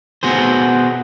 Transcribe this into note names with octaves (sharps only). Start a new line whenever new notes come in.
B3 F#4 G#4 C5